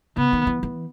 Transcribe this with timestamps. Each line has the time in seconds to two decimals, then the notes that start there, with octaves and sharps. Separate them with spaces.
0.17 C#3 B3
0.33 D#3
0.47 E3
0.63 E3